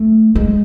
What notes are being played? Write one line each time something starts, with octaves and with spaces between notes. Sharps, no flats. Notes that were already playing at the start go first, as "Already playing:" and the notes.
Already playing: A3
G#3